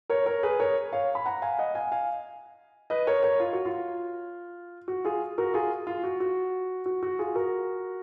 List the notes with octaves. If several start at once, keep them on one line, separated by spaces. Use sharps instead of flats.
A#4 C#5
A#4 C#5
G#4 B4
A#4 C#5
C#5 F5
B5
F#5 A#5
F5 G#5
D#5 F#5
F5 G#5
F5 G#5
B4 D#5
A#4 C#5
A#4 C#5
F4
F#4
F4
F#4
F4 G#4
F#4 A#4
F4 G#4
F4
F#4
F#4
F#4
F#4
F4 G#4
F#4 A#4